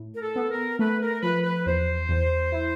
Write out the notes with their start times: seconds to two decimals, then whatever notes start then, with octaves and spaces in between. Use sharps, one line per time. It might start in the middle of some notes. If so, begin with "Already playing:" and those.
Already playing: A2
0.14 A#4
0.22 A4
0.36 B3
0.51 A#4
0.79 A3 B4
1.01 A#4
1.22 F3 B4
1.44 B4
1.66 E2 C5
2.09 E2
2.52 E4